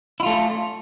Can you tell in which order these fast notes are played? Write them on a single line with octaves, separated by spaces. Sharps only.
E4 F4 A3